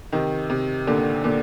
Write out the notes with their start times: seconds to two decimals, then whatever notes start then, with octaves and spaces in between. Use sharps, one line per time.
0.12 C3 D#3
0.50 C3
0.87 A#2 D3
1.24 A#2 D3